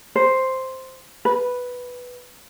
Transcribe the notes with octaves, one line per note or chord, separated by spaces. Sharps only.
C5
B4